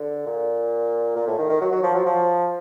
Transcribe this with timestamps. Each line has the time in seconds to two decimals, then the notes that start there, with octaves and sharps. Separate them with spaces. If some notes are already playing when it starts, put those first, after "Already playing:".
Already playing: D3
0.26 A#2
1.16 A#2
1.28 A2
1.38 D#3
1.49 D#3
1.61 F#3
1.72 F#3
1.83 F3
1.95 F#3
2.06 F3